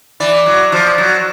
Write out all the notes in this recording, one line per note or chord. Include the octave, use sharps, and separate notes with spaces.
E3 D5
F#3
F3
F#3